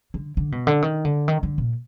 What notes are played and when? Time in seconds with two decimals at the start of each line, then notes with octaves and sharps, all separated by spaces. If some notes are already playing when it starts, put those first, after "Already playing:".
0.14 D3
0.37 D3
0.52 B2
0.67 D3
0.82 D#3
1.05 D3
1.28 D#3
1.43 D3
1.58 A#2